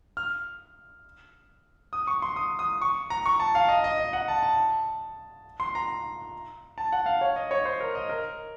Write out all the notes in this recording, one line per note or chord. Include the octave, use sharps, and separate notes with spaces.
F6
D#6
C#6
C6
D#6
D#6
C#6
A#5
C#6
A5
F5
D#5
D#5
D#5
F#5
A5
A5
C6
A#5
A5
F#5
F5
C#5
D#5
C#5
C5
A#4
D#5
A#4